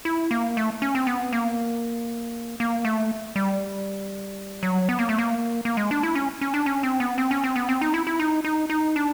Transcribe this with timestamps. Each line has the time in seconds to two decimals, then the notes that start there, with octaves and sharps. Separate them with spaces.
0.05 E4
0.31 A#3
0.57 A3
0.82 C#4
0.95 C4
1.07 B3
1.33 A#3
2.60 A#3
2.85 A3
3.36 G3
4.63 F#3
4.89 B3
4.99 A#3
5.09 A3
5.19 A#3
5.65 A#3
5.77 G#3
5.91 D4
6.03 E4
6.15 C#4
6.41 C#4
6.54 D4
6.66 C#4
6.83 C4
7.00 B3
7.18 C4
7.31 C#4
7.44 C4
7.56 B3
7.69 C4
7.81 D#4
7.94 E4
8.07 E4
8.20 D#4
8.45 D#4
8.70 D#4
8.96 D4